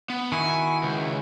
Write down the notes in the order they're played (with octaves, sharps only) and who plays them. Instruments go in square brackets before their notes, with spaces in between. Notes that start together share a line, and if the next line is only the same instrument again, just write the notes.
[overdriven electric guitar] B3
[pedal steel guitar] D#3 E4 F#4 [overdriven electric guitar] G#5
[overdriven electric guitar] C#2